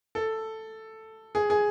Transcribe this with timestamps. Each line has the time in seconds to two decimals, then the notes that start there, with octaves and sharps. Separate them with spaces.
0.15 A4
1.35 G#4
1.50 G#4